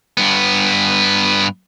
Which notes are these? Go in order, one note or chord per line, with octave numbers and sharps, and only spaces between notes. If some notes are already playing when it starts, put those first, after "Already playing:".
G2 B3